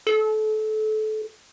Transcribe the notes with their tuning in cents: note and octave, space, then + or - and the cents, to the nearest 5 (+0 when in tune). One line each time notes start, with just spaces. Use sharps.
A4 -25